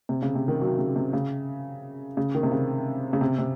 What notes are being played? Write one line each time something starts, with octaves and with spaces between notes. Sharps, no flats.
C3
C#3
C3
D#3
F#3
C#3
C3
C#3
C#3
D#3
C3
C#3
C#3
C3
C3